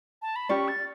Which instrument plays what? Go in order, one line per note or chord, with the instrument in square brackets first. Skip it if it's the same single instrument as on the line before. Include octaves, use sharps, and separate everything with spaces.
[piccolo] A5
B5
[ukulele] C#4 G4 D5 [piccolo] C#6
[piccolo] A6